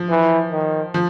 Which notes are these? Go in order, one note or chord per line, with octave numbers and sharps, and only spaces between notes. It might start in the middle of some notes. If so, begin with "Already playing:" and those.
Already playing: F3
E3
D#3
F3